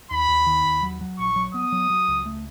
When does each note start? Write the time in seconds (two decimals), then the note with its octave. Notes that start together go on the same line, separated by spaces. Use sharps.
0.11 D#2 B5
0.29 D#2
0.46 D#3
0.65 D#2
0.83 F#3
1.01 F#3
1.19 A#1 C#6
1.36 F#3
1.54 B3 D#6
1.72 F#3
1.90 F#3
2.08 C#2
2.26 A3